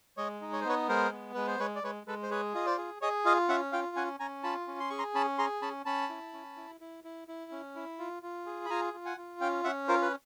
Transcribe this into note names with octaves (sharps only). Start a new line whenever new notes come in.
G#3 C#5 D#5
D#4
C#5
C5
B3 B4 C#5
G#3 A#4 C5
B3
G#3 B4
C5
G#3 B4 C#5
D5
G#3 B4 C#5
G#3 A4 B4
C5
G#4 B4 C#5
F4 D#5
C5 D5
G#4
G#4 C#5 D#5
F4 D#5 F5
C#4 E5 F#5
F4 F5 G5
C#4 F#5 G#5
C#4 G#5 A#5
F4 A5 B5
C#4
C6
G#4 C#6
A#5 C6
C#4 A5 B5
G#4 A#5 C6
C#4 A5 B5
C#4 A5 B5
E4
C#4
E4
E4
E4
E4
C#4
E4
F4
F4
G#4
B5
F4 G#5 A#5
F4
F#5 G#5
F4
C#4 F5 G5
C#4 E5 F#5
F4 A#4 C5
B4